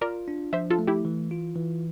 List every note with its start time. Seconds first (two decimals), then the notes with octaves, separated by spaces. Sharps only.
0.01 F4 A#4 D5
0.28 D4
0.53 F3 C5 E5
0.70 F4 A4
0.79 A3
0.87 E4 G4
1.05 E3
1.31 F4
1.56 E3